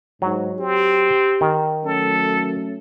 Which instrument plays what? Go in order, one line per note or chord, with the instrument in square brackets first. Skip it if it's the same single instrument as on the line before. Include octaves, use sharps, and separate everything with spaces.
[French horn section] G#2 [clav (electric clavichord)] F#3
[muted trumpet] C4 [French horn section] G4
[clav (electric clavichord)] D#3
[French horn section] F#3 A3 C#4 [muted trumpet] A4